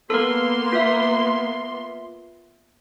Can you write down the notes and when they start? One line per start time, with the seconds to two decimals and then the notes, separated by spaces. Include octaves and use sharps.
0.10 A#3 B3 A4 A#4 C6
0.73 F4 E5